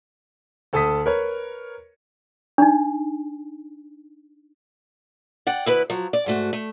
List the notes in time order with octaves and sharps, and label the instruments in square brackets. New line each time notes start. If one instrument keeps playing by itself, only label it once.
[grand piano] D2 A4 A5 D#6 B6
A#4 B4 C#5
[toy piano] D4 D#4
[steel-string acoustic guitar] D5 F#5 G5
D2 E4 B4
F3 F#3
D5
G#2 A3 F#4
A3